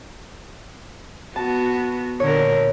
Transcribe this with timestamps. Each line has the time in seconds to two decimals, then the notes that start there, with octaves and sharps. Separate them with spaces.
1.36 B3 F#4 A5
2.20 A#2 D3 A#4 C#5